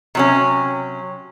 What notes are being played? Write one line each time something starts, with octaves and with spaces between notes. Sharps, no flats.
C3 F#3 C#4